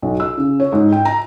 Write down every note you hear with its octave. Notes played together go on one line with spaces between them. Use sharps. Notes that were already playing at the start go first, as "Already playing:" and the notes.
B1
E6
C#3
C#5
G#2
G5
A#5